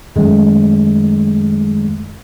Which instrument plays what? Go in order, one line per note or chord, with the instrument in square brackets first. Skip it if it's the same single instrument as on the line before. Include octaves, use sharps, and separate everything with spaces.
[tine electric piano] F#2 D#3 G#3 A3